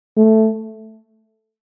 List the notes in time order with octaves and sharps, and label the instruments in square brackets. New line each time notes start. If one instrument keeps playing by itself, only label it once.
[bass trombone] A3